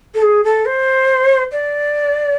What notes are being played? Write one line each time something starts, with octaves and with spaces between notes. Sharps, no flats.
A4
G#4
A4
C5
D5